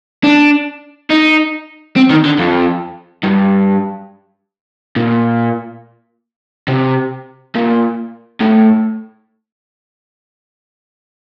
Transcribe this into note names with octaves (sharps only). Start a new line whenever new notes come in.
D4
D#4
C4
D#3
D3
F2
G2
A#2
C3
A#2
A2